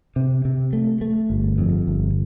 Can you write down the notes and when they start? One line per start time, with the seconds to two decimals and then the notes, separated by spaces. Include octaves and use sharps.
0.16 C3
0.45 C3
0.73 A3
1.01 A3
1.30 G1
1.58 F2
1.87 G1